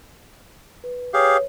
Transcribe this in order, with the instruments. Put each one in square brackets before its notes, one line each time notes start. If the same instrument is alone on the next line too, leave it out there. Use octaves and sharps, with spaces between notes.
[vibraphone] B4
[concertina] G4 G#4 F5 [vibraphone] B4 C#5